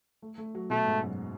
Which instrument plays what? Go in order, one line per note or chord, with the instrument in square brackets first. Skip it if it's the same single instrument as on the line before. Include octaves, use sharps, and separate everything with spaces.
[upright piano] A3
A3
F#3
[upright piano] B2 [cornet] A3
[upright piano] G#2
F#2